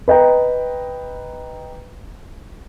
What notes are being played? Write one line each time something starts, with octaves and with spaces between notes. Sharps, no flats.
B4 D#5 G5 A#5